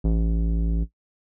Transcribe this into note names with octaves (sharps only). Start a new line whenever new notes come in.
A1